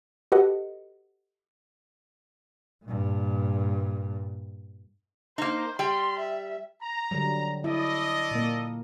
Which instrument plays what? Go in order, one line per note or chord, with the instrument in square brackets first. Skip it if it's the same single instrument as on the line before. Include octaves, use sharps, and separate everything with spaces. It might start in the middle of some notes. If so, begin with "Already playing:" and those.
[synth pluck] F#4 G4 A4 B4 D#5 F#5
[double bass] G2 A#2
[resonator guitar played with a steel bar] A#3 D#4 [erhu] C5
[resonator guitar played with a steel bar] G3 G5 [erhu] C6
[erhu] E5
[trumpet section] A#5
[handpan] D3 F#3 G3
[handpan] E4 [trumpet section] A4 D5 D#5
[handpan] A#2 A#3